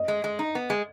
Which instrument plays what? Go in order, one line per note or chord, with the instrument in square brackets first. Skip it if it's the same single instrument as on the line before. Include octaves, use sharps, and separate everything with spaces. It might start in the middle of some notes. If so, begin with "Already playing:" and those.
Already playing: [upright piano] D#5
[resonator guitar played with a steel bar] G#3
G#3
D#4
B3
G#3